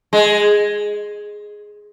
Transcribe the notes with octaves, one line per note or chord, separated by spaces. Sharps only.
G#3